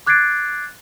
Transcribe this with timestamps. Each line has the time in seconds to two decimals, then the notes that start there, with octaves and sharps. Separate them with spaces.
0.06 D6 F#6 G#6 A6 C7 D7